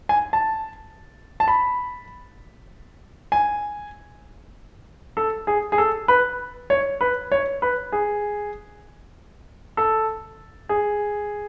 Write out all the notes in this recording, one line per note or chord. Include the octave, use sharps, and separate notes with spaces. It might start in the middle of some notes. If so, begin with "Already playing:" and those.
G#5
A5
A5
B5
G#5
A4
G#4
G#4
A4
B4
C#5
B4
C#5
B4
G#4
A4
G#4